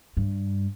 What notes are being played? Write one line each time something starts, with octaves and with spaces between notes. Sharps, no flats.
G2